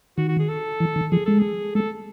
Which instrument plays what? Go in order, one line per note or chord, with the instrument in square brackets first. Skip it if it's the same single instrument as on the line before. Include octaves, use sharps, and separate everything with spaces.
[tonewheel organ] D#3 [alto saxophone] F#4
[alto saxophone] F#4
G#4
A4
[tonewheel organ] E3
D#3
[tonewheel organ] F3 [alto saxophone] G#4
[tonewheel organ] G#3 [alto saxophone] A4
[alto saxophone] G#4
[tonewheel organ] G#3 [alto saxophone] A4